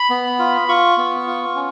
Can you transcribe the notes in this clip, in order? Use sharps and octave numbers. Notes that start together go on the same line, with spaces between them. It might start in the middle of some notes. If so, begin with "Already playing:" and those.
Already playing: B5
B3
F4
F4 C#6
B3
F4
C#4